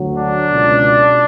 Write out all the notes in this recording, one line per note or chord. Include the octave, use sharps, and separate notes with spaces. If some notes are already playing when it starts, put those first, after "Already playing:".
Already playing: D2 D3 F#3
D4
C#2 B2 F#3